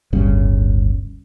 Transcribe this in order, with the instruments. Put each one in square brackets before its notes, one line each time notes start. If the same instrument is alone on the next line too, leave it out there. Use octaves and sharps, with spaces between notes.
[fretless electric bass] D1 G1 C#3 G3